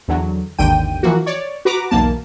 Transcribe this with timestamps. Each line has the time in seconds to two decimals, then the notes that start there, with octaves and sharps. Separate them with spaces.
0.08 E2 D3 F#3
0.58 G#1 D#2 D3 G5 D#7
1.03 E3 F3 A#3 F#4
1.26 C#5 D5
1.65 F#4 B4 A#5 D6
1.91 B1 E2 F#3 A#3 A5